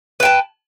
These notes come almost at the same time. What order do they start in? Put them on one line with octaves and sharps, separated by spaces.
B4 G5 A5